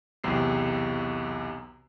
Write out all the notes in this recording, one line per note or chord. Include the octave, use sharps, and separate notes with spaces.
B1 E2 C3 C7